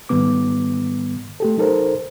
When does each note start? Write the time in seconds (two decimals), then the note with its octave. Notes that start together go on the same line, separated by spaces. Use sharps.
0.09 G#2 D#3 G3 B3 D6
1.40 A3 G4 A4
1.57 F#3 D#4 A4 A#4 C5